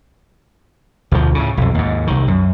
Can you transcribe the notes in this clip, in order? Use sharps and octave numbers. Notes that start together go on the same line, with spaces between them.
D2 B2 F3
A2 C#3
B1 F2
D#2 G#2
C2 D#3
F#2